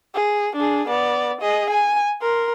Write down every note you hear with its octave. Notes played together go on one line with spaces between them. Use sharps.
G#4
D4 G#4
B3 D5
G#4 D#5
G#5
A#4 C6